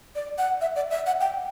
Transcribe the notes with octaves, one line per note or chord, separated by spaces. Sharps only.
D5
F#5
E5
D5
E5
F#5
G5